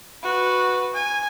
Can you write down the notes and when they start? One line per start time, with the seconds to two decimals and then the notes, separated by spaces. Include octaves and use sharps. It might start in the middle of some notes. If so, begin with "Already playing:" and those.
0.23 F#4 B4
0.93 G#5